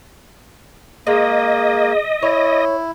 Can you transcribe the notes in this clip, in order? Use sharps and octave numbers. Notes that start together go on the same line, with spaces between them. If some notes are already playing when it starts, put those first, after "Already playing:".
G#3 A#3 D#5
E4 C#5